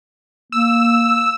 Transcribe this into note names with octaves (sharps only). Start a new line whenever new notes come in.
A#3 E6